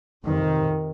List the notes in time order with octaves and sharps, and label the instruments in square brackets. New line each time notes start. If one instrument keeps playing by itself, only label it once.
[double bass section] F2 C3 D#3